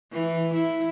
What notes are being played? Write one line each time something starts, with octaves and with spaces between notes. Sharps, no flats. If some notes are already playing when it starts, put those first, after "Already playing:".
E3
E4